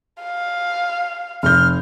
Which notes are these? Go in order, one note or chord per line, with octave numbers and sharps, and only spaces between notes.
F5
F1 F6 G6